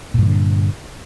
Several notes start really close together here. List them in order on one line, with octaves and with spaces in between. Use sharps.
A#2 G2 E3 D3